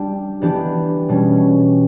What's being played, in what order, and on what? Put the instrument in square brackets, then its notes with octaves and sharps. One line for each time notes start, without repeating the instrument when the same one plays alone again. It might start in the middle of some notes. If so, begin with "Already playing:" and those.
Already playing: [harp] G3 D4 G4
E3 B3 D4 G4
B2 G3 C#4